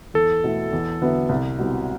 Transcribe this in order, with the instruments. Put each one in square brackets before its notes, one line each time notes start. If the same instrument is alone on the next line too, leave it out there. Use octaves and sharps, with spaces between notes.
[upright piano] E2 [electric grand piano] A4
[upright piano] B2 A3 E4
E2
D3 F#3 B3 E4
C2
B2 G3 C4 E4